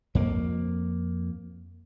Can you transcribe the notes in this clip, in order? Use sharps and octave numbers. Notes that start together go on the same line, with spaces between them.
F2 A#3